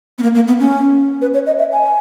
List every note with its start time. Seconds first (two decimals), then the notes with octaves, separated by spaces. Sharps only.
0.18 B3
0.23 A#3
0.35 A#3
0.48 B3
0.59 C#4
1.22 B4
1.34 C#5
1.46 D#5
1.59 E5
1.72 G#5